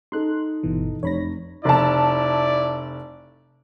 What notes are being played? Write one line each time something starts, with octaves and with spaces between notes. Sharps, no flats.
D#4 A4 C6 F#6
G1 B2 E3
F1 C#5 B5 A#6
F1 E4 D5 A5